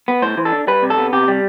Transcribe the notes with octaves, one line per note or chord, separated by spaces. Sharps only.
B3
A2 C5
E3
A4
D4
G3 B4
C3
A4
B3
C3 G4
G3